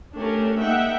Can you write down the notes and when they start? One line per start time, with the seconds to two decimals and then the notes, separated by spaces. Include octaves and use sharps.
0.14 A3 C#4 D4 G4 A#4
0.60 G#3 A#3 D#4 E5 F#5 G5